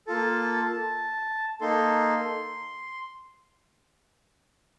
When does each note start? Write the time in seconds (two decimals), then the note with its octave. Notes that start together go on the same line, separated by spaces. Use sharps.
0.07 A#3 F4 A4 A5
1.61 A#3 D#4 A4 C6